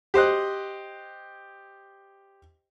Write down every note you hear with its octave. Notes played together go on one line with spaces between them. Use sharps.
G4 C5 D#5 F#6